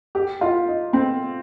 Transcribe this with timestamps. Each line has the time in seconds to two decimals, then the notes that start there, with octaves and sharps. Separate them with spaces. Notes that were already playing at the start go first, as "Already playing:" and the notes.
0.15 G4
0.41 F4
0.67 D#4
0.93 C4